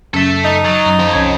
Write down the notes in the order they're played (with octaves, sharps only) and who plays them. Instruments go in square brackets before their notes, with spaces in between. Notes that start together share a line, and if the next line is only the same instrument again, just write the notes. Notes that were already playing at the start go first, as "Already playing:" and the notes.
[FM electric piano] F#2 C#3 [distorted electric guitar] A4 E5
[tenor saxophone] D#4
[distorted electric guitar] F#3 [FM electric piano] A6
[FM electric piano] F#2
[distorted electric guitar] F2
[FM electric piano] C2 C#4 G#6